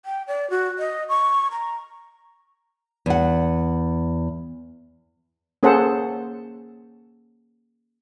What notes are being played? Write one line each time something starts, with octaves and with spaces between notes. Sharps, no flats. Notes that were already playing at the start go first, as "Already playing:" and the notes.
G5
D5
F#4
D#5
C#6
A#5
E2 F#5
A#3 C#4 G#4 A4 C5 F#5